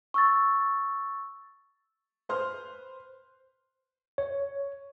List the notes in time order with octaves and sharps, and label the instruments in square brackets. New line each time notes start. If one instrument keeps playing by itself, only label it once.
[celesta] C#6 E6 A6
[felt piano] B4 C5 C6 F6
[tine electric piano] C#5